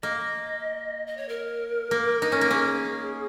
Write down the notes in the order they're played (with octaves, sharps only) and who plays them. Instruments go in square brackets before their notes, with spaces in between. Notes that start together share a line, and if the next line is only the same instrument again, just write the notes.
[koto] A#3 [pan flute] D#5
[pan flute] D#5
C#5
A#4
[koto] A#3
D#4
C#4
A#3
[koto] C#4 [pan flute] G#4